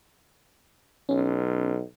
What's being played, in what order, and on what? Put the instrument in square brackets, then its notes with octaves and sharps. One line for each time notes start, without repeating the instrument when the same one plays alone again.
[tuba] B1 [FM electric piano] C#4